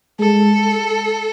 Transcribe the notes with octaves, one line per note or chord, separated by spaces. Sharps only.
G#3 A4